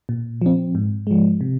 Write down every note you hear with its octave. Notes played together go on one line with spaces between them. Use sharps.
A#2
F3 C4
G#2
F3 G#3
C3